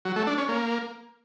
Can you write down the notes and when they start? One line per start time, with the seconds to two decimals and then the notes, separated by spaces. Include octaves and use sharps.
0.05 F#3
0.16 A3
0.27 D4
0.38 C#4
0.49 A#3